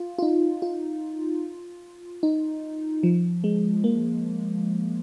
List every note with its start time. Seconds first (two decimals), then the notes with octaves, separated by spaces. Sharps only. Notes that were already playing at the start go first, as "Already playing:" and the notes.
Already playing: F4
0.18 F4
0.22 D#4
0.62 F4
2.23 D#4
3.03 F3
3.44 G#3
3.84 A#3